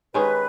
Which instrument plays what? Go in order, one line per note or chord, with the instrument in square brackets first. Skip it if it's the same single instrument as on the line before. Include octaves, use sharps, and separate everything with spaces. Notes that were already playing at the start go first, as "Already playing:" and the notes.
[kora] D#3 G#3 C#4 G#4 [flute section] B4